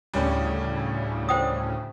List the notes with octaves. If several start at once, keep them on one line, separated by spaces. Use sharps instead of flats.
D2 A2 C#3 G3 C#4
C5 G5 D#6